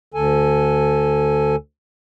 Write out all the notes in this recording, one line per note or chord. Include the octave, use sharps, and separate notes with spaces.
D2 D3 A4 G#5